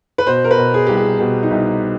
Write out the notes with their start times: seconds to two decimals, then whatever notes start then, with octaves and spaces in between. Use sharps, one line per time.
0.18 B4
0.26 B2 C5
0.44 A#4
0.51 B4
0.57 B2
0.74 G#4
0.87 C2 G4
0.97 G#4
1.20 B2 G4
1.43 D#4
1.51 C2